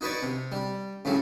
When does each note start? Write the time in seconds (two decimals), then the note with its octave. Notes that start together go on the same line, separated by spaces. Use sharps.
0.01 D#4 F#4 B4 C#5 D5
0.23 C3
0.52 G3
1.05 A2 C#3 F#3 G3